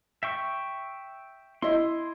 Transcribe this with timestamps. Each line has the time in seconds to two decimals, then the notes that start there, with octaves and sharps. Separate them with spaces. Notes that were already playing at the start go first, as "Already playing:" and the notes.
0.23 E5 G5 C#6
1.62 E4 D#5 C6